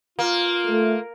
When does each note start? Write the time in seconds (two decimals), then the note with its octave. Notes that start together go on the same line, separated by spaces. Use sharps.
0.19 A#3 F4
0.66 A3